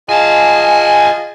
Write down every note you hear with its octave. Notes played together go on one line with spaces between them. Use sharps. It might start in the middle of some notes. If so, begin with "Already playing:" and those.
F4 G#4 D#5 G#5 A5